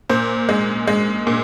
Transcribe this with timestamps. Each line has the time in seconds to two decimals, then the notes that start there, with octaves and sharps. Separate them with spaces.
0.09 A#2 C5
0.49 G#3
0.87 G#3
1.27 A#2